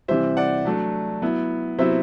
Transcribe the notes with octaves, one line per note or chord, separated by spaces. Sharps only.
C3 E3 G3 C5 E5
D5 F#5
F#3 A3 D4
F#3 B3 E4
C3 F#3 B3 E4 C5 E5